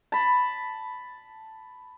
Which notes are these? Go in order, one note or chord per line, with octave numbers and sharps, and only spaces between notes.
A5 B5